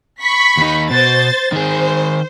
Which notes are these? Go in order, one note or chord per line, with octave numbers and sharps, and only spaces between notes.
B5 C#6 B6
D#2 D#4
B2 C5 A6
D#3 G#4 C5